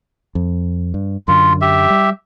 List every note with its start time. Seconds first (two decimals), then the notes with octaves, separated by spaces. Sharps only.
0.35 F2
0.94 G2
1.28 F#2 D3 F4
1.61 G4 E5
1.90 G3